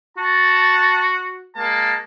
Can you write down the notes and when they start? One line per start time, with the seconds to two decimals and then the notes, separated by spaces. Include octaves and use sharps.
0.18 F#4 A5
1.56 G#3 A#3 A5